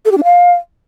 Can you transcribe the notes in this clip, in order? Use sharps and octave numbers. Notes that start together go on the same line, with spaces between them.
A4
G4
D4
F5